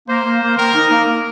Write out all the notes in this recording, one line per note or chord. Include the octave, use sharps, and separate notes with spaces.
A#3 C5
A#3
A#3
D#3 A#4
D#4
A#3
A#3